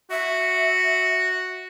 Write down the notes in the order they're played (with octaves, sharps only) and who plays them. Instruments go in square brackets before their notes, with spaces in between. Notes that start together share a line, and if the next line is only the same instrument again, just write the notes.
[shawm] F#4 [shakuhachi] E5